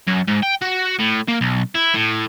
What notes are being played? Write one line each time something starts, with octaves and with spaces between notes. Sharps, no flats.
F#2
G#2
G5
F#4
A2
A#3
B1
E4
A2